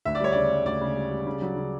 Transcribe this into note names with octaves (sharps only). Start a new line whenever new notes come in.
D2 E5
D5
G3 C#5
C#3 D5
G3
D2 D5
C#3
G3
G3
C#3
F#3
C#3